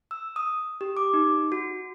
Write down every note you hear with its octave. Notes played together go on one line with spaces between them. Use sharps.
E6
D#6
G4
D6
D#4
F#4